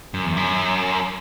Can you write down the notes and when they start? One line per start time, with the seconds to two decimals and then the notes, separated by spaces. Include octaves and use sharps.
0.14 F#2
0.25 E2
0.37 F#2